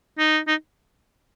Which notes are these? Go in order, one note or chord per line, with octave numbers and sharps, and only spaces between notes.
D#4
D#4